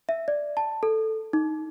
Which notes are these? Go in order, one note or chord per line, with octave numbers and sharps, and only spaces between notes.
E5
D5
A5
A4
D#4